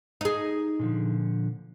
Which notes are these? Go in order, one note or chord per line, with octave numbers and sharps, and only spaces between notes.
D#4 G#4
A#2 D3 F3